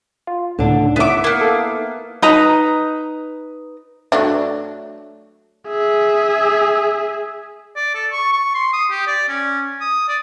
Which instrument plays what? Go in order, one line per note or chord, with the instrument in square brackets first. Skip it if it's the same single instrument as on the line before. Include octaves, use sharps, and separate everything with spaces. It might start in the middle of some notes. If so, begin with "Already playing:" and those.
[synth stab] F4
[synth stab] C#2 A2 [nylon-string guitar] D3 D4
[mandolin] B3 D6 [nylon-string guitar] E4 E5
[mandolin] A#3 B3
[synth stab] A4 F5
[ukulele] D#4 B4 A#5
[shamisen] F#3 A3 D4 [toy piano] E5
[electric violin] G#4 E5
[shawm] D5
A4
C#6
C#6
C6
D#6
G4
D5
C#4
D#6
D5